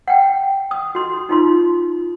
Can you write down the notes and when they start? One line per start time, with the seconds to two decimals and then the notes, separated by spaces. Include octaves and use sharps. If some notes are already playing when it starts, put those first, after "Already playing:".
0.08 F#5 G5
0.71 D#6
0.95 F#4 C6
1.29 D#4 F4 C6